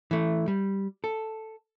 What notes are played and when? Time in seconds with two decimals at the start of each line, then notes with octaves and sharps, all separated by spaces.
0.11 E3 A3
0.48 G3
1.04 A4